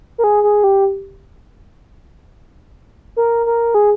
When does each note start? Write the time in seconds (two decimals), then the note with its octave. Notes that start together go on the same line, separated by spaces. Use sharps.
0.18 A#4
0.24 G#4
0.43 G#4
0.64 G4
3.17 A#4
3.46 A#4
3.75 G#4